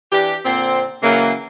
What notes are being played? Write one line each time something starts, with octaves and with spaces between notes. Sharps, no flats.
E3 D4 G4
A#2 D3 C4
C#3 E3 F#3 A#3